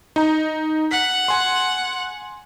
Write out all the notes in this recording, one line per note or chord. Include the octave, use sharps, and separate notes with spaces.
D#4 A#5
F#5 B6
G#5 C6